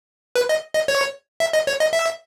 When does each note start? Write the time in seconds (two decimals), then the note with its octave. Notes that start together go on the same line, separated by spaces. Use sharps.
0.36 B4
0.49 D#5
0.74 D#5
0.88 C#5
1.40 E5
1.53 D#5
1.67 C#5
1.80 D#5
1.93 E5